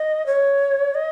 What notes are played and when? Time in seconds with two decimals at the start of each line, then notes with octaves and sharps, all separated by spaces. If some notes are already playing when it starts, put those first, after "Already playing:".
Already playing: D#5
0.26 C#5
0.95 D#5